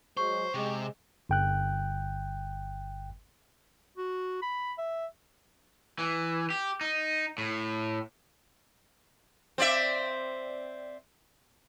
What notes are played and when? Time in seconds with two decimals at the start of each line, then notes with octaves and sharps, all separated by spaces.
0.17 F#3 G#3 C5 C#6
0.54 C3 G#3
1.29 G1 G5 F#6
3.97 F#4
4.42 B5
4.78 E5
5.99 E3
6.50 G4
6.81 D#4
7.38 A2
9.58 C4 D5 E5